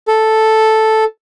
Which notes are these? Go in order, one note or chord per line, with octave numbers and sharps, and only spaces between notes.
A4